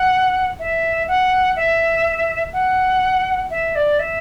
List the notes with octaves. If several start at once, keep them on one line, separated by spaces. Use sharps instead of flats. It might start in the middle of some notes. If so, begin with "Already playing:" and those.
Already playing: F#5
E5
F#5
E5
F#5
E5
D5
E5